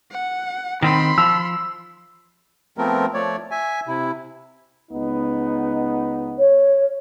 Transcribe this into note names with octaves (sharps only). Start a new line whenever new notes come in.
F#5
D#3 C4 B5 C6
F3 E6
F3 A3 B3 C4 A#4
F3 A3 C#5 D5
E5 G#5
C3 E4
C#2 B3 D#4
C#5